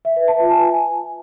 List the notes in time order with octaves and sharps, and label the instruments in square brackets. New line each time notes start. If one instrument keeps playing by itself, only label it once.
[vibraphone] E5
B4
A5
F4
G#5